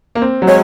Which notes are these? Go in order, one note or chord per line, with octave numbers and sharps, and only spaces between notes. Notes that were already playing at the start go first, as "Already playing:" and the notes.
A#3
C4
F#3
G#3 C#5